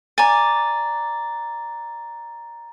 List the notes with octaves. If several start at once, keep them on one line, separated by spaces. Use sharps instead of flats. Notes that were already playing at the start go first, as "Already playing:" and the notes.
D5 G#5 A#5 A6